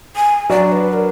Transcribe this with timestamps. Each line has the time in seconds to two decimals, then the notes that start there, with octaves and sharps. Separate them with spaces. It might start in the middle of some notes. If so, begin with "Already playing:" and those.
0.16 G#5
0.50 F#3 D4 F#4 D5
0.72 B4
0.93 A#4